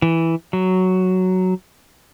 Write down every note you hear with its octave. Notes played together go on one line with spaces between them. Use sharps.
E3
F#3